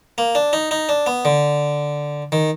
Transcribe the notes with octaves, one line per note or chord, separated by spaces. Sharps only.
A#3
D4
D#4
D#4
D4
B3
D3
D#3